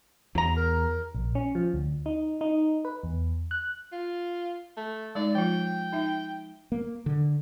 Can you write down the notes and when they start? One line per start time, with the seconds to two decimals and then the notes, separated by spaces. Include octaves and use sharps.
0.35 E2 F#3 A#5
0.57 A#4
1.15 A#1
1.35 C#4
1.55 F3
1.74 D2
2.06 D#4
2.41 D#4
2.85 B4
3.03 E2
3.51 F#6
3.92 F4
4.77 A3
5.15 G#3 D#4 D5
5.35 F3 F4 G5
5.93 D#4 E5
6.72 A#3
7.06 D3